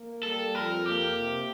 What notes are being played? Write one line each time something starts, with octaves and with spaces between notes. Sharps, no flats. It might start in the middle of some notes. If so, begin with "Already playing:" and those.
Already playing: A#3
G3 A4
F2 A#4
A#3 G4
C3